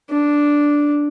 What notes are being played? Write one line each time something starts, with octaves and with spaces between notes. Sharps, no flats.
D4